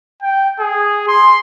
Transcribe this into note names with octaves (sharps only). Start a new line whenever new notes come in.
G5
G#4
C6